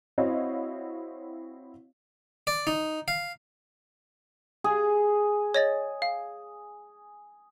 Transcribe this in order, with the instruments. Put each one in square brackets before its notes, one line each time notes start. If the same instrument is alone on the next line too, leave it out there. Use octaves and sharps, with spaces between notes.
[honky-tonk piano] C4 E4 F#4 C#5 D#5 F5
[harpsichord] D5
D#4
F5
[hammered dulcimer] G#4
[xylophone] C#5 D#5 A6
F5